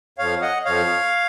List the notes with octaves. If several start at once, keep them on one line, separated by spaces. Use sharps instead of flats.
F2 F3 C#5 F5
D#5 F#5
F2 F3 C#5 F5